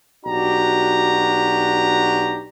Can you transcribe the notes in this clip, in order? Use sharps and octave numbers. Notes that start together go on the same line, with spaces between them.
B1 D4 F#4 G4 A#5